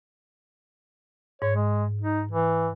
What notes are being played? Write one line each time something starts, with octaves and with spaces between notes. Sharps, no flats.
G#2 C#5
G#3
D#4
E3